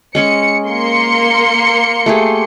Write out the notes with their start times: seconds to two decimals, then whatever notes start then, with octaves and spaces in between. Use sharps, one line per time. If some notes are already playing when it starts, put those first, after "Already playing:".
0.15 G#3 C#4 G#4 C#7
0.67 A#3 C6 C#7
2.06 A3 G4 G#4